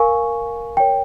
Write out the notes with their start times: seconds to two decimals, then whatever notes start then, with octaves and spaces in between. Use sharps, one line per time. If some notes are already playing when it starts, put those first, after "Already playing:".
Already playing: A#4 F5 G#5 C#6
0.77 A#4 C#5 G5